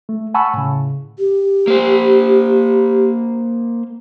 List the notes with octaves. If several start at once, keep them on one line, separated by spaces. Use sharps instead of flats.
A3
F#5 G#5 A5 B5 C#6 E6
A2 C#3
G4
A#3 C5